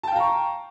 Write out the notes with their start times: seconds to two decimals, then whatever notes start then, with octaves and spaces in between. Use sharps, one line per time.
0.03 A5
0.08 G5
0.12 F5
0.16 A#5
0.20 C#6